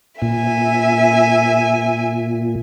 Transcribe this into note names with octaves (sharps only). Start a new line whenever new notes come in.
A#2 E5 G#5